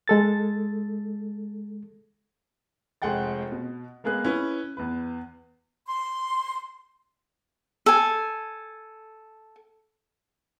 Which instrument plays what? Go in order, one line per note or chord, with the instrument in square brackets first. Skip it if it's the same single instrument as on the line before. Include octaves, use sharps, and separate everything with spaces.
[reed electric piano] G#3 A4 A6
[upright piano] F1 G#3 G#4 F#5 G5 A6
B2
G#3 A#3 B3 G#4 F#6
C#4 E4 B4
E2 B4
[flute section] C6
[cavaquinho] A4 G#5